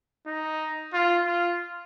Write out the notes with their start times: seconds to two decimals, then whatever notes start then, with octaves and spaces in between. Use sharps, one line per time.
0.27 D#4
0.93 F4
1.26 F4